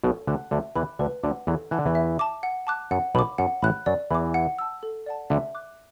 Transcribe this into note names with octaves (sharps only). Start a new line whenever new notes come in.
B1 B2 A4
D2 D3 F#5 A5 F#6
D2 D3 E5
E2 E3 B5 D6 F#6
D2 D3 B4
D2 D3 F#5 D6
E2 E3 A4
E3 F#5 A5 F#6
D3
E2 E3
E5
A5 D6
F#5
A5 D6 F#6
F#2 F#5
B1 B2 B5 D6
F#2 F#5
A1 A2 B5 F#6
F#2 F#3 D5
E2 E3 B5 D6
F#5
A5 E6
A4
D5 F#5 A5
D2 D3 E5
D6 F#6